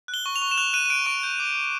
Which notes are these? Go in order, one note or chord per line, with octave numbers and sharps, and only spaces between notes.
F#6
G7
C#6
F7
C#6
E7
F#6 F7
F#6 D#7
D#7
F#6 D7
C#6 D7
G6
D6
D6